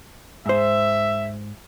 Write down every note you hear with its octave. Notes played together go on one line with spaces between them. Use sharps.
G#2 C5 E5